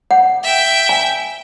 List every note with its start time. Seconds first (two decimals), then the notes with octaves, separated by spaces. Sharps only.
0.11 F#5
0.44 E5 G5
0.89 G#5